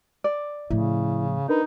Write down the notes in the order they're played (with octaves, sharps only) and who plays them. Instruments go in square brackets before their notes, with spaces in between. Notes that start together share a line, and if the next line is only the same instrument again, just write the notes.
[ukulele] D5
[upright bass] A2 F3 [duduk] C#3 [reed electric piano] E4
[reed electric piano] D4 A#4 B4 [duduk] D#4